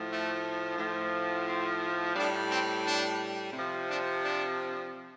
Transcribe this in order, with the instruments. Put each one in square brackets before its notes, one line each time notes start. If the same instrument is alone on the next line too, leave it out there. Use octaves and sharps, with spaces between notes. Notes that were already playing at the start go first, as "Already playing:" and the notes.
Already playing: [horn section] A2 F3
A3
A2 F3
C4
A2 G3 D4
C4
D4
C3 F3
D4
D4